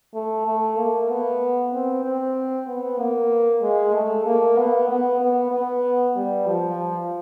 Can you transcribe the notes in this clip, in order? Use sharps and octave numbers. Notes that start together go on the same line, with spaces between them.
A3
A3
A#3
B3
C4
C4
B3
A#3
G#3
A3
A#3
B3
B3
B3
B3
G3
F3